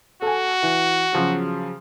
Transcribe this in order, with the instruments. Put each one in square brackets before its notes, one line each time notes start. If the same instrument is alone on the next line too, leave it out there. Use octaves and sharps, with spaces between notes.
[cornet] F#4 [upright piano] A4 G#5
[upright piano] E3
C#3 F3 F#3